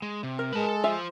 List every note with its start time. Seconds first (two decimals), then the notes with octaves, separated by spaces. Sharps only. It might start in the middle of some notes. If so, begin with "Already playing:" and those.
0.02 G#3
0.23 C3
0.39 A#4
0.53 G#3 B4 A5
0.69 A4
0.84 F4 A4 C5 E5 G#5